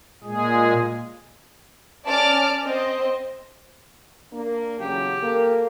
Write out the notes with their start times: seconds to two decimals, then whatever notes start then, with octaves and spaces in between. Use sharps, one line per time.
0.24 A#2 G#3 G#4
2.07 C#4 D5 A5 D6 F6
2.64 C4 C5 D#5
4.33 A#3 D4
4.80 E2 C#3 F#3 G4
5.23 A#3 A4